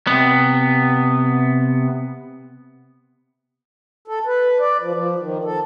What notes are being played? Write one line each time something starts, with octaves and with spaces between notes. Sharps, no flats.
C3 B3
A4
B4
D5
F3
F3
D#3
A4